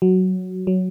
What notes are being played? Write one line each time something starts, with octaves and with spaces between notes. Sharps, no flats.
F#3
F#3